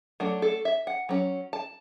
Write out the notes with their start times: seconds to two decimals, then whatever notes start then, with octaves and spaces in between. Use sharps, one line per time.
0.20 F#3 A3 D4
0.42 A4
0.65 E5
0.87 F#5
1.09 F#3 C#4
1.53 A5